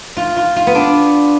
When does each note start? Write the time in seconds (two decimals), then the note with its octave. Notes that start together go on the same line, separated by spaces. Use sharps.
0.17 F4
0.37 F4
0.56 F4
0.67 B3
0.75 D4